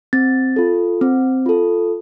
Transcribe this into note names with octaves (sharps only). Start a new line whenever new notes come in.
C4 A6
F4 A4
C4
F4 A4